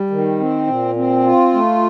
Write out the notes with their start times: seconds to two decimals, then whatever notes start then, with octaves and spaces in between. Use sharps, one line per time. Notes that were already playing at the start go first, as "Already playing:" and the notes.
Already playing: G3
0.10 D#3
0.40 C4
0.67 A#2
0.96 C4
1.24 F4
1.54 A3